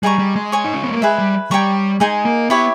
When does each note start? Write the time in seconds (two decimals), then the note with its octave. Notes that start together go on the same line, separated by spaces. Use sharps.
0.03 G3 G#4 D#5 A#5 C#6
0.19 G3
0.36 G#3
0.52 C#5 G#5 C#6
0.64 D#4
0.74 C#4
0.84 B3
0.92 A#3
1.02 G#3 G#4 B4 E5
1.19 G3
1.51 G3 C#5 G5 A#5 C#6
2.00 G#3 D#4 G#4 D#5 G#5
2.25 A#3
2.50 B3 E4 G4 C#5 E5